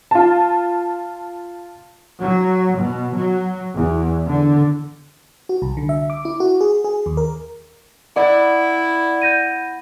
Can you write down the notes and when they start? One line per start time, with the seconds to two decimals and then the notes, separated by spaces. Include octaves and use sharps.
0.11 F4 A5
2.20 F#3
2.78 B2
3.16 F#3
3.75 E2
4.27 D3
5.49 F#4
5.62 C2
5.77 D3
5.89 E5
6.10 D6
6.25 E4
6.40 F#4
6.61 G#4
6.84 G#4
7.06 D#2
7.17 A#4
8.16 B3 E4 D5
9.22 G6 A#6 D#7